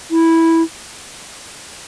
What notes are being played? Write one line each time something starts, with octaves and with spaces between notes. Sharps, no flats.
E4